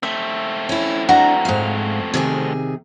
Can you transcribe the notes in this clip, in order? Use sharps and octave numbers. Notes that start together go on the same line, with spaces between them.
A3 C4 E5
C#4 E4
D4 F#4 A#5
G#2 F5
C3 D#3 G#4